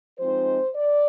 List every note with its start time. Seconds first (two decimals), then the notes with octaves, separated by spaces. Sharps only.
0.19 F3 G#3 C4 D#4 C5
0.75 D5